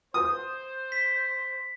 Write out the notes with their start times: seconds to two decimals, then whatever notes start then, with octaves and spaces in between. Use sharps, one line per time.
0.14 C5 D#6
0.92 B6